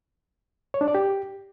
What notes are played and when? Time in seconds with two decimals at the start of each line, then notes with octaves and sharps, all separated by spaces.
0.74 C#5
0.81 D4
0.88 D5
0.95 G4